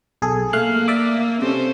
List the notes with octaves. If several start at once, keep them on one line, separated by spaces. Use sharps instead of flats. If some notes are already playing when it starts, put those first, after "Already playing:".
B1 G#4 A4
A3 A#3 F5 F#6
D5 E5 D6
C3 C#4 A4 C5